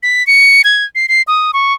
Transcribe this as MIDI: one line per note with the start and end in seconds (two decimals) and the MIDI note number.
0.03 0.26 95
0.27 0.62 97
0.64 0.85 92
0.95 1.06 96
1.09 1.22 96
1.27 1.51 87
1.54 1.73 85